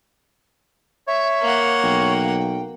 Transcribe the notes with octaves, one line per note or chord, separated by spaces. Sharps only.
C#5 E5
A#3 F#5
B1 G5